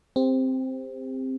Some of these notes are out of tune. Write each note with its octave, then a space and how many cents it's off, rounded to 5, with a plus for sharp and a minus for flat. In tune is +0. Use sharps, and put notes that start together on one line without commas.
C4 +0 G4 +35